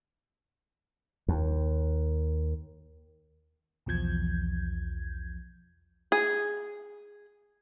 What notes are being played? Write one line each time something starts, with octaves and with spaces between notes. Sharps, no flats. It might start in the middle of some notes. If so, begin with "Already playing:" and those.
D#2
B1 E2 F3 G6 G#6
G#4